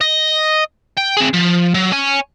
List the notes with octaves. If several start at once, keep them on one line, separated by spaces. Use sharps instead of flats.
D#5
G5
C4 G#4
F3
F#3
C#5 G#5